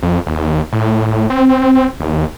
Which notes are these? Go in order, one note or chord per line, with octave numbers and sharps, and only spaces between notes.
F2
D#2
A2
C4
D#2